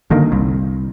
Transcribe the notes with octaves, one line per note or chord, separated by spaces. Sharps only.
F#1 D3 D#3 A#3
C2